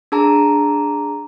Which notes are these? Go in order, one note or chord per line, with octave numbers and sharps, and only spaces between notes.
D4 G#4 A5 A#5